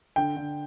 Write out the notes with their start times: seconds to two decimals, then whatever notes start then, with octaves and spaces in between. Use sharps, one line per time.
0.16 D3 G5
0.36 D3